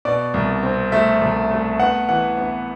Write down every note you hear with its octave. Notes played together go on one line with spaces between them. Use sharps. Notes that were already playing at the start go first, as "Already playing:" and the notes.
B2 D5
C2
C4
A3 E5
C2
A3
B3 F#5
E3 F#5
B3